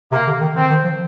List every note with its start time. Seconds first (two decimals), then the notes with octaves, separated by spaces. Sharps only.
0.12 C3 A#3
0.27 D3
0.41 D#3
0.55 D#3 C4
0.70 D#3
0.84 F3